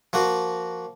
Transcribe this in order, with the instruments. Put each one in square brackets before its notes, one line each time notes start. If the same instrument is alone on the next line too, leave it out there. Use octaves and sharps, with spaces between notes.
[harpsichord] F3 A#3 F#4